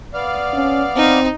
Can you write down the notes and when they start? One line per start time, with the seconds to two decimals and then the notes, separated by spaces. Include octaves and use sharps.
0.14 B3 D5 F5
0.54 C#4
0.96 C4 D#4